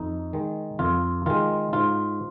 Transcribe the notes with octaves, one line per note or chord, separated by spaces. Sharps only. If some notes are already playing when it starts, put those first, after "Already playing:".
Already playing: F2 D#4
D#3 G#3
F2 F4
D#3 G#3 F4
G#2 F4